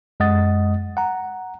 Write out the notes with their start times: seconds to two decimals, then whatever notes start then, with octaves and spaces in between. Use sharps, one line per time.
0.20 F#2 G#3 D#5 F#5 D#6 A6
0.97 F#5 A#5